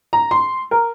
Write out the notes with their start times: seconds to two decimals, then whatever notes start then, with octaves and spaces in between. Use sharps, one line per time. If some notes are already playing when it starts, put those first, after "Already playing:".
0.13 A#5
0.31 C6
0.71 A#4